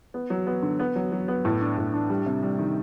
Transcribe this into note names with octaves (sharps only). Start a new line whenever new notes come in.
B3
F#3
B3
D3
B3
F#3
F#3
B3
A2
D4
A2
D4
G3
C3
G3
D#3